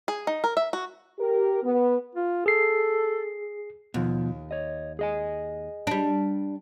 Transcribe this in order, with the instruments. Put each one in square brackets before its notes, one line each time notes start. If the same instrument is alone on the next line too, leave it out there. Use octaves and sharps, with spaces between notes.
[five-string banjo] G#4
D#4
A#4
E5
F#4
[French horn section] G4 A#4
B3
[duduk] F4
[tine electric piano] G#4 C7 [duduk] A4
[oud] D#2 [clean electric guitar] B2 F3
[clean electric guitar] C#5 D#5
G#4 D#5 G#5
[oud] G3 D4